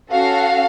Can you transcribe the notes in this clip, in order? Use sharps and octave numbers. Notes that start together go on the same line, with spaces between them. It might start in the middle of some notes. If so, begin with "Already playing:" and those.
C#4 F#4 A4 F5